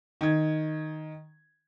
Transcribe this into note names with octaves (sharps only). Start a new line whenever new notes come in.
D#3 G#6